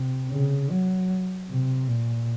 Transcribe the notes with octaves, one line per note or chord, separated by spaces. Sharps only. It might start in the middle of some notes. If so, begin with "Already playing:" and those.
Already playing: C3
C#3
F#3
C3
A#2